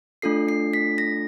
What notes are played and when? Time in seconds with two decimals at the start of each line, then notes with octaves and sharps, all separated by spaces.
0.22 A3 D4 F4 A4 C7
0.49 C7
0.74 B6
0.98 A#6